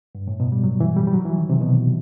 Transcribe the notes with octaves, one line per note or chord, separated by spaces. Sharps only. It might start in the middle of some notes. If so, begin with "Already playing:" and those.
G2
A2
B2
G3
F#3
E3
G3
G3
F#3
E3
D#3
C3
B2